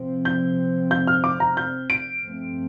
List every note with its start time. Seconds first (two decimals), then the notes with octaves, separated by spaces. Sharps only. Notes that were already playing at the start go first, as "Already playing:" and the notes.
Already playing: C3 F3 C4
0.25 G6
0.91 G6
1.07 F6
1.24 D6
1.40 A#5
1.57 G6
1.90 D7
2.22 G2 F3 A3 C4